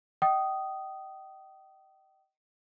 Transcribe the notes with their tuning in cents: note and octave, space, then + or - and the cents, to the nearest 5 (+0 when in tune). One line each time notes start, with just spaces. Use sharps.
D#5 +0 G5 -35 D#6 +0